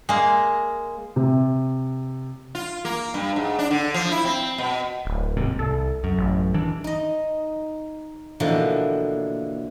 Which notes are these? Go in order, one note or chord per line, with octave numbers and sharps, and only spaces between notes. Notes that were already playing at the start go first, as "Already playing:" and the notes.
G#3 A#3
C3
F4
A#3
G2
G#2
D4
D3
F3
E4
C4
B2
D1
D#2 G#2 C3
C2 A4
F#2
A1
D#3 E3 D4
D#4 D#5
B2 D3 E3 F3 A#3